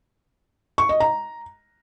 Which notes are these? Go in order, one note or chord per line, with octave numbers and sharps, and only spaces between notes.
C#6
D#5
A#5